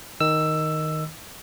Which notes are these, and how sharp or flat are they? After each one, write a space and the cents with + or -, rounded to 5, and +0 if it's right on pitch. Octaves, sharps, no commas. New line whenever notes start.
D#3 +0 D#5 +0 E6 +10